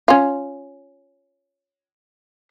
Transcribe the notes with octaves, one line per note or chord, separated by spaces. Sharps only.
C#4 F4